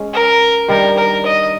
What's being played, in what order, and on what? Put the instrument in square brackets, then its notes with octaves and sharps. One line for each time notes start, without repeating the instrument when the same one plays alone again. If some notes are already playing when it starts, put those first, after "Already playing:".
Already playing: [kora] G#3 C#4
[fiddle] A#4
[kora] G2 D#3 G3 [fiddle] A#4
[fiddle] A#4
D#5